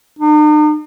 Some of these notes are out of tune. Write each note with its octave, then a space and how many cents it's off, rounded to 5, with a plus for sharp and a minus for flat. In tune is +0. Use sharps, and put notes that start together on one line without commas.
D#4 -45